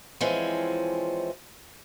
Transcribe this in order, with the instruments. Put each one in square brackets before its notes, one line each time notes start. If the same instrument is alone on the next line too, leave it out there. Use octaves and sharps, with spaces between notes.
[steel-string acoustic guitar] E3 F3 G#3 C4 C#4